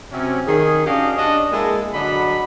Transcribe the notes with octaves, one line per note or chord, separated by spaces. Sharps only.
C3 F#3 C#4
D#3 G#4
C#4 D4 F#4 G4 D#5 F5
D4 C#5 D#5
G#3 A#3 E4 G#4 A4
D3 F#3 D4 D#5 F#5 B5